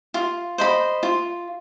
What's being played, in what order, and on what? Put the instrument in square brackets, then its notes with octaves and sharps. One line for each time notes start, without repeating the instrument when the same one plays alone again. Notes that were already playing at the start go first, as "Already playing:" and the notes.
[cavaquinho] F4
C5 D#5 B5
F4